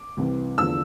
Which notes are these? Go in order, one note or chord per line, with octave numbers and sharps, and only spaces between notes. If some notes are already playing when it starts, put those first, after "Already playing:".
Already playing: D6
C2 C3 E3
E2 D3 F3 E6